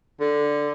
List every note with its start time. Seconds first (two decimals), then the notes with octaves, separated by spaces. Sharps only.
0.20 D3